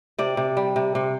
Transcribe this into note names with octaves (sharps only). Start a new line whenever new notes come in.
C3 D5
C3
G3
C3
C3